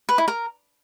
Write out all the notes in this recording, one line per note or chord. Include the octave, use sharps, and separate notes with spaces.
B4
E4
A#4